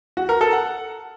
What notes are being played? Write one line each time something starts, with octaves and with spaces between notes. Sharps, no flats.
F#4
A#4
A4
F#5